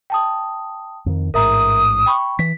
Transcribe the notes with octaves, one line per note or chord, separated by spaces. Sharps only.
G5 A5 D#6
F2 D3 D#3
A1 G#2 A#4 E5 A#5 D#6
G5 B5 C#6
E3 B6